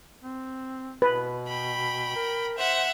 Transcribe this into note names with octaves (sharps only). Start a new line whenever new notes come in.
C4
B2 B4
G5 B5
A#4
C5 E5 F#5